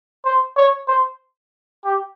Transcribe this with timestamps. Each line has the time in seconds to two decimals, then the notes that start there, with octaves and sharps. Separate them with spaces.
0.25 C5
0.57 C#5
0.88 C5
1.85 G4